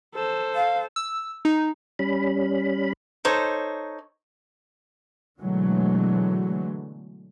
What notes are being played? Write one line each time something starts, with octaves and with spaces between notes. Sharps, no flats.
A4 C5
F5
E6
D#4
G3 C#4 B5
D#4 A4 C5 C#5
B2 D3 E3 F#3 G#3 A3